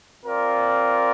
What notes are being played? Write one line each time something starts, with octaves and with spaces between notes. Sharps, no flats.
C4 F4 A#4 D5